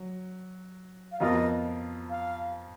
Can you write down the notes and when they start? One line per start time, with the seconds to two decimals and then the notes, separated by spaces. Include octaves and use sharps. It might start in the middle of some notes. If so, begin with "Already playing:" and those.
Already playing: F#3
1.12 F5
1.20 F2 F3 B3 F4 A#4 D#5
2.10 F5